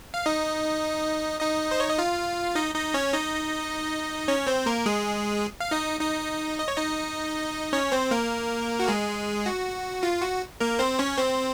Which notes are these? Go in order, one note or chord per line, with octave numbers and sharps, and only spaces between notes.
F5
D#4 D#5
D#4 D#5
C5
C#5
D#5
F4 F5
D#4 D#5
D#4 D#5
C#4 C#5
D#4 D#5
C#4 C#5
C4 C5
A#3 A#4
G#3 G#4
F5
D#4 D#5
D#4 D#5
D#5
C#5
D#4 D#5
C#4 C#5
C4 C5
A#3 A#4
F#4
G#3 G#4
F#4
F4
F#4
A#3 A#4
C4 C5
C#4 C#5
C4 C5